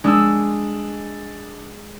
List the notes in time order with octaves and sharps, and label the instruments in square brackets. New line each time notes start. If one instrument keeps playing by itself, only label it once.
[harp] G#3 [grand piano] D4 D#6 E6